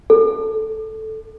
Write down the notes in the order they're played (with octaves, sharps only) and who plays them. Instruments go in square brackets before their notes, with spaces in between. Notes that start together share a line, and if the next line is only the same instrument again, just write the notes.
[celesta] A4